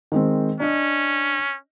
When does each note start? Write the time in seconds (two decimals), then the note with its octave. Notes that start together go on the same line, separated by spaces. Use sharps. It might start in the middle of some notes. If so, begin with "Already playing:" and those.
0.12 D#3 G#3 C4
0.60 C#4 D4 D#5